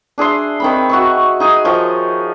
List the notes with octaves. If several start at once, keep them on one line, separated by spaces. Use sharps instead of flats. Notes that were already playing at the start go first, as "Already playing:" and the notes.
D4 G#4 E5 C6
D#3 C4 B5
F#4 E5 C#6
D#4 G#4 G#5
D#3 F3 C#5